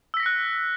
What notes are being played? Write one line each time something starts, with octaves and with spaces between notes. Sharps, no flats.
E6 F#6 A#6 B6 C#7